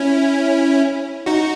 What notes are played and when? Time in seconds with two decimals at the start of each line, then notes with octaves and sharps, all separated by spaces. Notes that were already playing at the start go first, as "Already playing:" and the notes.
Already playing: C#4 E4
1.26 D#4 F#4